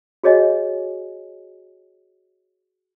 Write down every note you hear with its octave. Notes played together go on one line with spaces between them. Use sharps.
F#4 G#4 C#5 D#5 G#5